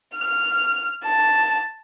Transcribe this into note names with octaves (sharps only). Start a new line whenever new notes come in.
F6
A5